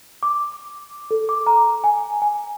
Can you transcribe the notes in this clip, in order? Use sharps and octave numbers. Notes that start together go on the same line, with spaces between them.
D6
A4
D6
A#5
G#5
G#5